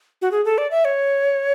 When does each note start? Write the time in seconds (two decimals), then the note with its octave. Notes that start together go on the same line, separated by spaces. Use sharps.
0.22 F#4
0.32 G#4
0.45 A4
0.58 D5
0.71 E5
0.85 C#5